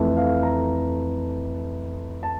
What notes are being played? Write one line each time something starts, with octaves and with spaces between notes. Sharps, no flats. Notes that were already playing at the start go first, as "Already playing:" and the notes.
Already playing: F2 E3 A3
F5
A#5
A5